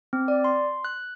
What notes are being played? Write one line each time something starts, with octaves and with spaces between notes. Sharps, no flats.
C4
D5
C6
F#6